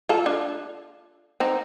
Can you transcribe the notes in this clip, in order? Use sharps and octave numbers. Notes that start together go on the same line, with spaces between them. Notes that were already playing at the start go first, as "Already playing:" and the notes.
F4 A4
D4 F4
C4 D#4